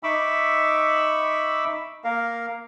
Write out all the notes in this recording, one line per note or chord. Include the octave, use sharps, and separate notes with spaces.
D#4 E5 B5 C#6 D6 E6
A#3 A#4 F5